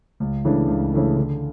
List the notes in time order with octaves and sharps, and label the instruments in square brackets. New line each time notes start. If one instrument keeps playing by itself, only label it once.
[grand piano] C#2
C#3 E3 A3 D4
C#2
C#3 E3 A3 D4
D3